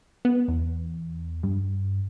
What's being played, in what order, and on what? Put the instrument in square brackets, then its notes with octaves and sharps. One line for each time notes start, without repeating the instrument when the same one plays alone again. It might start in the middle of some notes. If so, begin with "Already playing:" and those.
[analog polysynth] B3
E2
G2